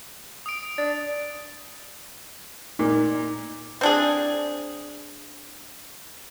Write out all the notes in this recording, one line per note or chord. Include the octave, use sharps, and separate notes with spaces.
D#6 D7
D4 A6
A#2 D#4 A#4
C4 D4 G#4